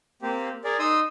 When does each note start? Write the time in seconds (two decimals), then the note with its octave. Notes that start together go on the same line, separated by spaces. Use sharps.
0.22 A#3 C4 G4
0.64 G#4 A#4 D5
0.79 D#4 C6 D#6 E6